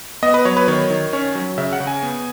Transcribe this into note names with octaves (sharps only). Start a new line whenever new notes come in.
B3 D#5
B4
F#3 C#5
B4
D#3 C#5
D#3
C#4 C#5
F#3
C#3 E5
F#5
C#3
G#5
B3